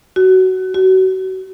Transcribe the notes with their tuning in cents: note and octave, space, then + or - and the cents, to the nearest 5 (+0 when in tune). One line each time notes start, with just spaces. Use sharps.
F#4 +15
F#4 +30